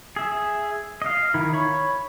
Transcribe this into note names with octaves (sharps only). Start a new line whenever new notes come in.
G#4 E5
D#5 F5
D#3 E4
C#5 B5 C#6